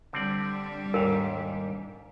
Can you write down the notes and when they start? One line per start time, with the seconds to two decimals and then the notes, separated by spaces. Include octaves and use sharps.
0.13 D3 G3 C4 D4 D5
0.94 D#2 G#2 A#4